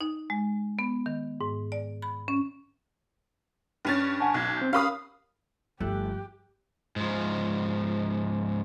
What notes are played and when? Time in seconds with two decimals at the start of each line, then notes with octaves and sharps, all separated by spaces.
0.01 D#4
0.30 G#3
0.79 B3
1.06 D#3
1.41 G#2
1.72 D5
2.02 B5
2.28 C#4
3.85 G2 C#4 A6
4.20 F#5 G#5 A5
4.34 B1 F#6 G#6
4.57 C4 G6
4.73 C#4 G4 A#4 F5 B5 D#6
5.80 G1 G2 F3 A3 G4 F#6
6.96 G#2 F3